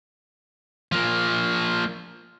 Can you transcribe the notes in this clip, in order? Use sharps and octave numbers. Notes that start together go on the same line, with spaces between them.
F3 A#3